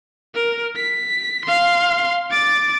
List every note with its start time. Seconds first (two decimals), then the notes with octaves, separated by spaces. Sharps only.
0.35 A#4
0.76 B6
1.46 F5 C6
2.31 D6 A6